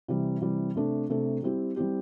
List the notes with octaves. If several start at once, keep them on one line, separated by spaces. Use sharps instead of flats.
C3 E3 G3
C3 E3 G3
C3 A3 D4 A4
C3 A3 D4 A4
G3 C4 E4 G4
G3 C4 E4 G4